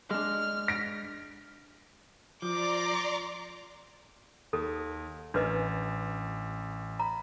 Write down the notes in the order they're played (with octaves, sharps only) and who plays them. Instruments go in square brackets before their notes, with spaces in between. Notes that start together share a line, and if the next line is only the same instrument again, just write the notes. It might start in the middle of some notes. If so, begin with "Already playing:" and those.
[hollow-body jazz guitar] G#3 D4 [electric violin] F6
[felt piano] A#6 D7
[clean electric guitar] F3 [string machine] D5 A#5 C6 [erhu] D6
[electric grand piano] D#2 [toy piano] A4
[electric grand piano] A1 [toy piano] D4 B4 D#5
[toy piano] A#5 [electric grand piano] B5